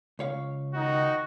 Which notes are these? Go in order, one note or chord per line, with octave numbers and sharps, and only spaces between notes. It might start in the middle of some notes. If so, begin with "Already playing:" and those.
C#2 C#5 F5
D#3 D#4 F#4